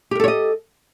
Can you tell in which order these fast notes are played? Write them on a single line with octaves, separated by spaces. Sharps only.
G4 A#4 A4 C#5 D#5